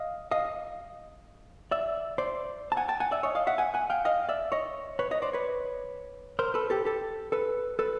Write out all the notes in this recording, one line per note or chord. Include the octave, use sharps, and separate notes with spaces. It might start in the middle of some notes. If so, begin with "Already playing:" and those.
Already playing: D#5 F5
D#5 F5
D5 E5
C5 D5
A5
F#5 G#5
G5 A5
F#5 G#5
D5 E5
C#5 D#5
D#5 F5
E5 F#5
F#5 G#5
F#5 G#5
F5 G5
D#5 F5
D5 E5
C#5 D#5
B4 C#5
C#5 D#5
C5 D5
B4 C#5
A#4 C5
A4 B4
G4 A4
G4 A4
A4 B4
A4 B4